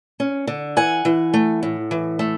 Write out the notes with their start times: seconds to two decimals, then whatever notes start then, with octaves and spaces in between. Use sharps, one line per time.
0.20 C#4
0.47 D3
0.77 E3 F#5 G#5
1.05 E3
1.34 A3
1.63 A2
1.91 E3
2.19 A3